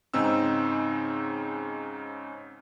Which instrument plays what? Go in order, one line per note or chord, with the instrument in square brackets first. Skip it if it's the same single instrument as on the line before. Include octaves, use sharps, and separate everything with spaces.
[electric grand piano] G#2 C#3 C4 D#4 E6